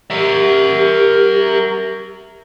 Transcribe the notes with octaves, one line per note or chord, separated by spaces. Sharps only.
G4 A#4 E5